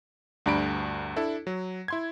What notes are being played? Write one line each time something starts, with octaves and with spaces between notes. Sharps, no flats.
D2 G2 D4 A#5 B5 D7
D4 E4 A4
F#3
E4 C6 G#6